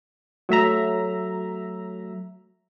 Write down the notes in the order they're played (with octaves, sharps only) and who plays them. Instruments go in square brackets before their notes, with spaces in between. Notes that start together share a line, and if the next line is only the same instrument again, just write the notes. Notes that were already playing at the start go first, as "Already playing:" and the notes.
[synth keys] F#3 A3 E5 A#5